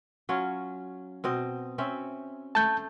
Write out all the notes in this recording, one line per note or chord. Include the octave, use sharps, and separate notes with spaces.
F#3 C#4 F4
B2 C4 D#5
C4 C#4 E5
A3 A5 G6